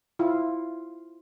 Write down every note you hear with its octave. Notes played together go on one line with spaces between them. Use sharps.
E4 F4